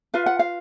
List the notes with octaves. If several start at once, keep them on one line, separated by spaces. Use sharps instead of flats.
F4 B4 F5
F#5
F5